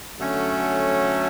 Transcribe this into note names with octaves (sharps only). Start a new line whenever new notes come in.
D3 F#3 A3 C#4